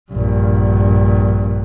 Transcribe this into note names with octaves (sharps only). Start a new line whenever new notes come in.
A#1 G2